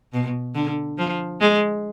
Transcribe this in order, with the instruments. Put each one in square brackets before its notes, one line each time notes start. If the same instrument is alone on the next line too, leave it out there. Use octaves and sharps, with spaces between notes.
[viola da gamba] B2
D3
F3
G#3